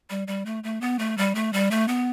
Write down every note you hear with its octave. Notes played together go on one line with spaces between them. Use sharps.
G3
G3
A3
A3
B3
A3
G3
A3
G3
A3
B3